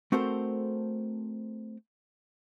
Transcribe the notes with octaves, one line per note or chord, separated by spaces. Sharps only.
A3 C4 F#4 A4 A#4 C5